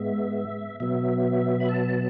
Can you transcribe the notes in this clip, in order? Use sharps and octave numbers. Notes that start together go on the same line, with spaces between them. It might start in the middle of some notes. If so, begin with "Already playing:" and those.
Already playing: G#2 G#3 B3 E5
B2 F#3 B3 E5
B5
A5